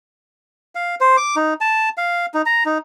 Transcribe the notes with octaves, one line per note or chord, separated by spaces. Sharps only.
F5
C5
D6
D#4
A5
F5
D#4
A#5
D#4